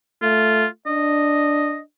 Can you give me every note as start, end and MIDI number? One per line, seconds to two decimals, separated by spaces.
0.23 0.65 57
0.23 0.66 65
0.87 1.81 62
0.87 1.80 75